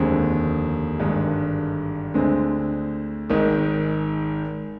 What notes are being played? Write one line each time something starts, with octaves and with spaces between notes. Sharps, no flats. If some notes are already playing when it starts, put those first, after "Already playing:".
Already playing: F1 D#2 D3 G#3 C4
G#1 G2 D3 G#3
D2 D3 G#3 C4
G#1 G#2 D#3